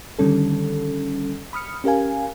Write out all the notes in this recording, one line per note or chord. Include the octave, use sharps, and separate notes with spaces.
D3 D#3 G3 C#4 A4
B5 D#6 F6 C#7
C#4 G4 A#4 F5 G#5